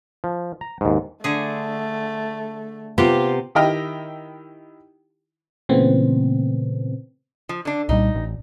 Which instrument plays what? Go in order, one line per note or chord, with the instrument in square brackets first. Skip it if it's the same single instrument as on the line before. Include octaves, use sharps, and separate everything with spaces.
[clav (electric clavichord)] F3
A#5
D#2 G#2
[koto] D3 G#4 [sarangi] A3
[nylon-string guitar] C3 B3 [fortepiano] F4 [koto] G4
[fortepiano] D#3 E4 G4 D#5 G5 F6
[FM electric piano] A#2 C#3 E3 A3 B3 C4
[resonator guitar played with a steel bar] F3
D3 D4
[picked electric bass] C2 A#2 G3 [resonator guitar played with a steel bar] D#4
[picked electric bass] A1